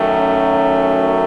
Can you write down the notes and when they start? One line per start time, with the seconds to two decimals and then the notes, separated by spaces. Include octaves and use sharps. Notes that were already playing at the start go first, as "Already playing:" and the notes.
Already playing: F#2 D#3 F#3 A3
0.16 C#4